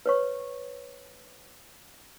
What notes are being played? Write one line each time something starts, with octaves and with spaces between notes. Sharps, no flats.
B4 C#5 C#6